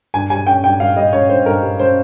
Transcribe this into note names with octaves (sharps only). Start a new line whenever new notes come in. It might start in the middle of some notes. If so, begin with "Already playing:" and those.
G2 G#5
G3 G#5
C#4 G5
G2 G5
G2 F5
G3 D#5
C#4 C#5
G2 C5
G2 A#4
G3
C#4 C5